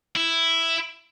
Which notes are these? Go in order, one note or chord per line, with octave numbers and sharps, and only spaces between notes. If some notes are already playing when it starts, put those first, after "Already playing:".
E4